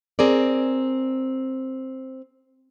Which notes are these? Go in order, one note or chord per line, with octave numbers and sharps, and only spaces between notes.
C4 G#4 A#4 D5